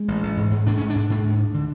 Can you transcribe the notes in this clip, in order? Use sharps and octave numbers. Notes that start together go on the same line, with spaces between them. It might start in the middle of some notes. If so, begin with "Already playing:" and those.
Already playing: G#3
A1
A1
G#2
G#2
G#2 D4
G#2 C#4
D4
G#2
G#2
D2
D2
D3